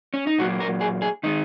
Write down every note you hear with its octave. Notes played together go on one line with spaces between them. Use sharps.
C#4
D#4
A#2 F#3 A#3 F#4
A#4
G#4
G#4
D#3 G#3 D#4